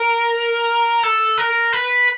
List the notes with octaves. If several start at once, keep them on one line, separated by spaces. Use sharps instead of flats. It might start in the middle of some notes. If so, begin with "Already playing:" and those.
Already playing: A#4
A4
A#4
B4